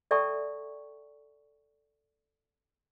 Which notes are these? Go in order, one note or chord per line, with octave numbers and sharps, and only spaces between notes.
A4 D5 E5 G5 A5 C#6